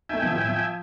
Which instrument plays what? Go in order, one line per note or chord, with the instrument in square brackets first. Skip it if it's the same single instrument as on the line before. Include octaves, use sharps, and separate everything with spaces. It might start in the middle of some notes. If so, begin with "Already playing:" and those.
[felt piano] A3 D#4 [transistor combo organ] E5 G5 G#5
[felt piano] B2 D#3 F3
A2
F3